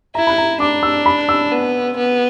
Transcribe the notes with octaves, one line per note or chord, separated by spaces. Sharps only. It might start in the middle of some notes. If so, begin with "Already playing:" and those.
E4 A#5
B5
A#5
D4 D6
E6
B5
E6
B3
B3